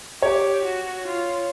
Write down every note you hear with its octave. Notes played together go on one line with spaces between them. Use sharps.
G4 C#5
F#4
F4